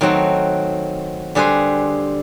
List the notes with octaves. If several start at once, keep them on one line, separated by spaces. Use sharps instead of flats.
D#3 F#3 A3 C4 F#4
D3 G3 G#4 B4 C5